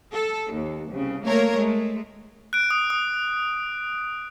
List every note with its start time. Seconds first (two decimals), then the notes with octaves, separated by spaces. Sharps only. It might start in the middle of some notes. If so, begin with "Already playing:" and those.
0.12 A4
0.52 D#2
0.92 C2 C#3
1.25 A3 A#3 A#4 C#5
1.54 G#3 A3
2.53 F#6 D7
2.71 D#6
2.90 D#6